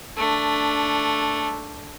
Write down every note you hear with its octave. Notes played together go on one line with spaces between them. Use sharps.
A3 D4